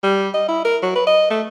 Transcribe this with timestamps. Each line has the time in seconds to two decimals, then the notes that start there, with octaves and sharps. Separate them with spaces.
0.03 G3
0.34 D#5
0.48 E4
0.65 A#4
0.83 F#3
0.95 B4
1.07 D#5
1.31 A3